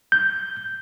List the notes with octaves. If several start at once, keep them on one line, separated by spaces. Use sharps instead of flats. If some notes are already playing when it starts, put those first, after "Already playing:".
G6